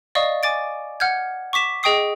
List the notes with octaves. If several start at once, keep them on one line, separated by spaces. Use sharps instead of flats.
D5 D#5 F5 C#6 D#6
G#5 D6 A6 D7
F#5 F6 G6 G#6
C#6 D6 B6 E7
G#4 D#5 G5 C#6 D#6 C7